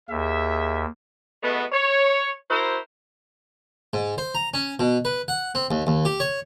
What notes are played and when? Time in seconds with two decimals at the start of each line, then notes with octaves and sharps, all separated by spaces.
0.10 D#2 G#4 E5
1.43 B2 G#3 A3 B3
1.72 C#5
2.50 E4 F#4 A#4 C5
3.93 G#2
4.18 C5
4.35 A#5
4.54 C#4
4.79 B2
5.05 B4
5.28 F#5
5.55 C4
5.71 D#2
5.87 D#2
6.05 G4
6.20 C#5